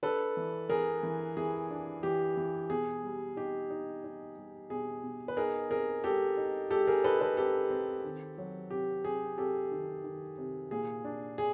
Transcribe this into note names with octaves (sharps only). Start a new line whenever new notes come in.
D4 A4 B4
E3
E3 G#4 A#4
E3
E3 G#4
D4
E3 G4
E3
B2 G#4
G3
D#4 G4
D#4
D#4
G3
B2 G#4
B2
B4
D#4 G#4 A#4
C4 G#4 A#4
G#3 G4 A4
D#4
G#3 G4 A4
G#4 A#4
D#4 A4 B4
A4 B4
C4 G4 A4
C4
D#3
F#3
C3 G4
C3 G#4
C3 G4 A4
D#3
D#3
C3
A#2 G#4
D4
G#4